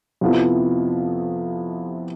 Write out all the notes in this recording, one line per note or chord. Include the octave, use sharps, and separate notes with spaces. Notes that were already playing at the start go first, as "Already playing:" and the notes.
F2 C3 F3 B3 E4